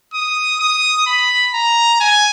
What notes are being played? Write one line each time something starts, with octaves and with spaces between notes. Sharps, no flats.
D#6
D#6
B5
A#5
G#5